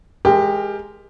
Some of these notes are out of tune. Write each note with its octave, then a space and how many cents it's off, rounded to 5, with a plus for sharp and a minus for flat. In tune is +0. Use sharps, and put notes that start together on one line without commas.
G#3 +0 G4 +20 A#4 +0